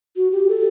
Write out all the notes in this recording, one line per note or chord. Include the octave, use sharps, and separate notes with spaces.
F#4
G4
A4